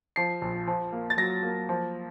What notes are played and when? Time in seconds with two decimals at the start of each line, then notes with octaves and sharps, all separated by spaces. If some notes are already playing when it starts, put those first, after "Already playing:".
0.16 F3 C7
0.41 A#1
0.67 F3
0.92 A#3
1.10 A6
1.17 F#3 A#6
1.43 A#3
1.69 F3